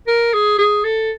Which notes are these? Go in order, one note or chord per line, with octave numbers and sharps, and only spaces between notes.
A#4
G#4
G#4
A4